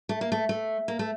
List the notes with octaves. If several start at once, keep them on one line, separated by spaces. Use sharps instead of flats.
A3
A#3
A3
A3
A#3
A3